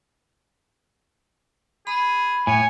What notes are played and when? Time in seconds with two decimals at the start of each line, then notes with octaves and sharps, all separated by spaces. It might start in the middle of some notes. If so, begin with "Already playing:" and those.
1.87 G#4 B5
2.47 A2 C#5 G#5